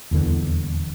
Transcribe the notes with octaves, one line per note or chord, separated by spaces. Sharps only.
D#1 E2 D3 B3